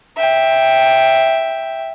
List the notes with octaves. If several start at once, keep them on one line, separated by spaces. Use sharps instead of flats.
E5 G5